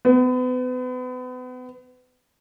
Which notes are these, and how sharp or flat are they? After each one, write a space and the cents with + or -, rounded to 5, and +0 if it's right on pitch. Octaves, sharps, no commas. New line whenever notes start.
B3 +35